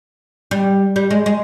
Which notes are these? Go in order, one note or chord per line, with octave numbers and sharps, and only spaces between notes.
G3
G3
G#3
G#3